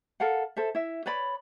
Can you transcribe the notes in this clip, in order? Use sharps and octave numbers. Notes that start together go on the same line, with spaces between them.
A4 A#4 F5 F#5
A4 C5 E5
E4 E5
B4 C#5 D5 B5